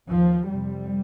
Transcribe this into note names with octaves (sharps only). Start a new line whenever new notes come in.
D#2 F3
F2 C3 G3